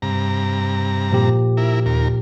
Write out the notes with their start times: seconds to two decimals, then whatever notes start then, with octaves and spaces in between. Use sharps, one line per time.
0.02 G2 C3 A#5
1.12 A#2 F3 G4
1.57 E4 A#4
1.86 D#2 A#4